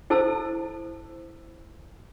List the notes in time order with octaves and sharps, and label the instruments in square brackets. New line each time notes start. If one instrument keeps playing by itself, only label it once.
[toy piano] E4 A4 C5 A5 E6